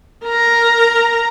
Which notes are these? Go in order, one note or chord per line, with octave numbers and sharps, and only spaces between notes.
A#4 A#5